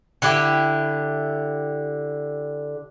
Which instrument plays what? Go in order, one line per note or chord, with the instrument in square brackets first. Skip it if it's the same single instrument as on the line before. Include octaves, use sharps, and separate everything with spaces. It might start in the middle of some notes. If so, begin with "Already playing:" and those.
[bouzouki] D3 E4 G4